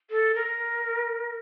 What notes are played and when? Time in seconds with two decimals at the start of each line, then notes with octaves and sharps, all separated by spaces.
0.10 A4
0.34 A#4